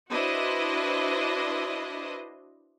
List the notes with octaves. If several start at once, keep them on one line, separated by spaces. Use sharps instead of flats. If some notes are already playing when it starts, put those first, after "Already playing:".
D4 E4 F#4 B4 C5 D#5